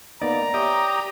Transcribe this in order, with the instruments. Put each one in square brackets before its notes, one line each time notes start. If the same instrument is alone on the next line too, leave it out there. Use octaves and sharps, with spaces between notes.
[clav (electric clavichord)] A#3 B3 D#4 [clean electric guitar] D5 [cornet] A#5
[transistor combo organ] G4 D6 D#6 [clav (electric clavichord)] C#5 E5